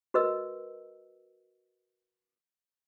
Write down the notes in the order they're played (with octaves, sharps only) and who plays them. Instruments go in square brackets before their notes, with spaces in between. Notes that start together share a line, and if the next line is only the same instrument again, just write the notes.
[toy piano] F#4 A#4 B4 D#5 E6